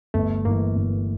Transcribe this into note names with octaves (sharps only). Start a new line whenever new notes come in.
G1 A3
G2 E3 A#3
G1